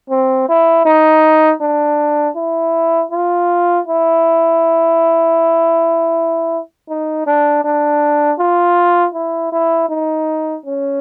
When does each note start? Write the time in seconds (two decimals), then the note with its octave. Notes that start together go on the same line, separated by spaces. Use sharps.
0.10 C4
0.49 E4
0.86 D#4
1.61 D4
2.36 E4
3.12 F4
3.87 E4
6.89 D#4
7.27 D4
7.65 D4
8.39 F4
9.14 E4
9.52 E4
9.89 D#4
10.66 C#4